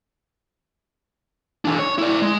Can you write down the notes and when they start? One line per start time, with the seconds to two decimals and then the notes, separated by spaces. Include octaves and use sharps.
1.65 E3 D4
1.79 C#5
1.98 E4 D5
2.22 G#3